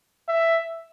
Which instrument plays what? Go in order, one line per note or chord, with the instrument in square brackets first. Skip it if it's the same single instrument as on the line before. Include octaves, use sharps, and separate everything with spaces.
[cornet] E5